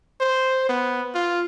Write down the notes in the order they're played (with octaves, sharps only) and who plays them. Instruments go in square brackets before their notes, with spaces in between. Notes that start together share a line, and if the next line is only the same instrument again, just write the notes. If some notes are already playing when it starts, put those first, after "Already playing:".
[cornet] C5
B3
F4